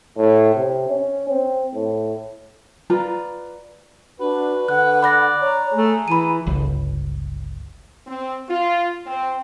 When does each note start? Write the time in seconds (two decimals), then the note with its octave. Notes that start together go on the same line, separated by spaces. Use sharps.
0.17 A2
0.55 C3
0.88 C#4
1.29 C4
1.74 A2
2.90 F4 B4 D5 A#5
4.20 D4 F#4 B4
4.68 D3 F#5 F#6
5.02 D5 B5 F#6 A#6
5.41 C#5 A#5
5.73 A3 G#4
6.08 E3 B5 D#7
6.47 G1 C#2
8.06 C4
8.49 F4
9.05 C4